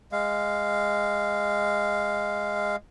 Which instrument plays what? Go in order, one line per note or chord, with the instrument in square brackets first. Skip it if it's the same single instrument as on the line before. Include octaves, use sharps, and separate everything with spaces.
[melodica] G#3 F5